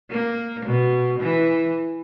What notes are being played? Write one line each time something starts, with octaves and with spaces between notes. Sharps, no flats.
A#3
B2
E3